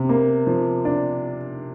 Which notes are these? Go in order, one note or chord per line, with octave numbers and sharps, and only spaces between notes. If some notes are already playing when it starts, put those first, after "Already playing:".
Already playing: C3
A#3
F3
D4